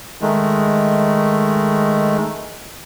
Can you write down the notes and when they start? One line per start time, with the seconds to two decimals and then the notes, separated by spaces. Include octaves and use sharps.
0.21 D#3 G#3 A3